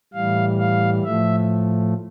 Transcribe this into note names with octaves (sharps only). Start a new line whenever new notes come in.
A2 E3 G3 F5
F5
A2 F3 A3 E5